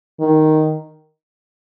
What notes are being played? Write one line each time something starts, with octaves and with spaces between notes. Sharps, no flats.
D#3